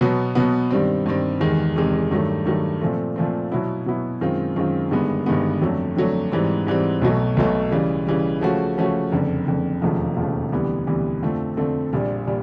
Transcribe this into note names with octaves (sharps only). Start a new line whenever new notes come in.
B2 F#3 B3
B2 F#3 B3
G2 D#3 G3 C4
G2 D#3 G3 C4
E2 C3 D#3 G#3
E2 C3 D#3 G#3
G2 D#3 F#3 A3
G2 D#3 F#3 A3
A#2 F3 A3 C4
A#2 F3 A3 C4
B2 F#3 B3 E4
B2 F#3 B3 E4
F#2 D#3 G#3 C4 F4
F#2 D#3 G#3 C4 F4
G1 G2 D#3 G#3 B3
G1 G2 D#3 G#3 B3
F2 D3 F#3 A3
F2 D3 F#3 A3
G#2 E3 G3 C4
G#2 E3 G3 C4
B1 B2 F#3 A3
B1 B2 F#3 A3
C#3 E3 G3
C#3 E3 G3
C#3 F3 A3 C#4 F#4
C#3 F3 A3 C#4 F#4
F#1 F2 D3
F#1 F2 D3
E1 D#2 C#3 F3 A3
E1 D#2 C#3 F3 A3
D2 C3 E3 G3 B3
D2 C3 E3 G3 B3
F2 D3 F3 A3 C4
F2 D3 F3 A3 C4
A#1 A#2 G3
A#2 G3